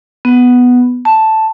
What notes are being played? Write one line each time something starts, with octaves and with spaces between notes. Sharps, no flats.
B3
A5